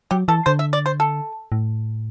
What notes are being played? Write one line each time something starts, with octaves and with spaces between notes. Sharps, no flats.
F#3 G4
E3 A4
D3 C5
E5
D5
C5
A4
A2